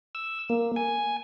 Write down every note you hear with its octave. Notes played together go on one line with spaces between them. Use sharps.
E6
A#3
G#5